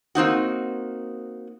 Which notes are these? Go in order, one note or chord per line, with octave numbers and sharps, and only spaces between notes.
A#3 C4 D#4 F#4